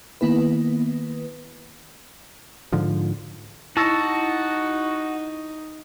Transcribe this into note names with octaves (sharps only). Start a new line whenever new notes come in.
D#3 A#3 B3 E4 B4
G#2 D3 F3
D#4 E4 F#4 A5 C#6 E6 A#6